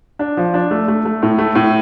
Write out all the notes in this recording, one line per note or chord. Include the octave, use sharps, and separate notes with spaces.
D4
F3
D4
A3
A3
A3
A2
A3
A2